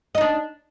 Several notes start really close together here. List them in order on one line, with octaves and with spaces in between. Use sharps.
D#5 D#4 D4